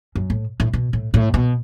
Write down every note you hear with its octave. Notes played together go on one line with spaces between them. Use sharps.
F#2
A2
A2
B2
A2
A2
B2